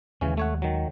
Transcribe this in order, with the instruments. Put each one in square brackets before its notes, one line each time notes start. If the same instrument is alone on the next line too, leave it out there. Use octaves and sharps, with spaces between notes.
[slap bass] D#2 G#3 [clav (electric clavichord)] C#3 E3 C#4
[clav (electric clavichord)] A3 C#5 F#5
D#3 F#3